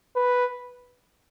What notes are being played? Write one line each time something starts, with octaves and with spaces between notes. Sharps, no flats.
B4